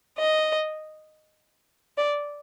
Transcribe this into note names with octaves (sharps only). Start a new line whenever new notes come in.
D#5
D5